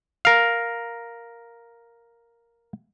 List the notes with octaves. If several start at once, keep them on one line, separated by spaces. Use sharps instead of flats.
A#4 F5